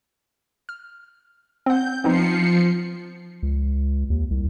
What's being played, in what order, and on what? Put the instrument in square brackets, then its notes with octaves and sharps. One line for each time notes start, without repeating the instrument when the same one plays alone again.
[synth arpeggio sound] F6
[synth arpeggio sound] C4 F#5 [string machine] G6
[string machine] F3 C7 C#7 [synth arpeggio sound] B3 C4 D#4
[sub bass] C#2
D#2
C2